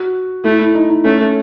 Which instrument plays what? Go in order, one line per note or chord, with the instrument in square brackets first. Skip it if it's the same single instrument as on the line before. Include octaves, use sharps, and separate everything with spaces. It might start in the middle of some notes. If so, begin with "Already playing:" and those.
Already playing: [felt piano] F#4
[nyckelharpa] A3 [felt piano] E4
[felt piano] E4
D#4
D#4
[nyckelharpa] A3 [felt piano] C#4